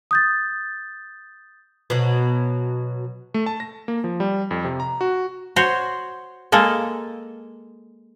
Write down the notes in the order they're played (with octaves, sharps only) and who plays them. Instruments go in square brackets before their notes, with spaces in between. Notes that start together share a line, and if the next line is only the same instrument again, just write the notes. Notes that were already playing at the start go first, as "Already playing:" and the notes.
[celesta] D#6 G6 A6
[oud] B2 F#3
[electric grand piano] A3
A5
A#6
A#3
F3
G3
F2
C3
A#5
F#4
[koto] F#4 C5 C#5
G#3 A#3 A4